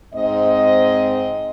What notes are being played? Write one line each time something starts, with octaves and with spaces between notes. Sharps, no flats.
G#2 C4 D#5